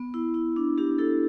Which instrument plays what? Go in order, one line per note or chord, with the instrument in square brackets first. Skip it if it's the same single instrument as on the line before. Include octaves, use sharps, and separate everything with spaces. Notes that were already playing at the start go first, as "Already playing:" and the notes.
Already playing: [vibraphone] B3
E4
E4
D4
D4 G4
E4 A4